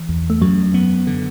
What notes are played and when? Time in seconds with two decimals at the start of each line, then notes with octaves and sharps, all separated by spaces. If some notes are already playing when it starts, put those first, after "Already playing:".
Already playing: E3
0.09 E2
0.30 A3
0.41 F#2 F#3
0.74 B3
1.07 D3